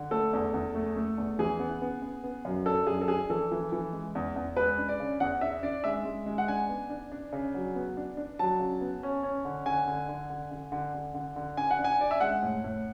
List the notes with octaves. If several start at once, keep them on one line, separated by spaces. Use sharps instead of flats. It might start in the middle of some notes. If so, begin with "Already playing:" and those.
Already playing: D3
A3 A4
E2
E2
A3
A3
E2
E3 G#4
B3
B3
B3
B3
F#2
D4 A4
F#2 G#4
A4
D4 G#4
E3 A4
E3
E3
G#3
E2
E2
G#3 B4
D4
D5
C#3
E2 F#5
D4 E5
D4 D5
G#3 E5
G#3
G#3
F#5
D4 G#5
B3
D4
D4
C#3
F#3
B3
D4
D4
F#3 A5
C#3
B3
C#4
C#4
D3
D3 G#5
D3
D3
D3
D3
D3
D3
D3
D3
D4 G#5
F#5
D4
G#5
D4 D5
E5
G#3 F#5
A2
A2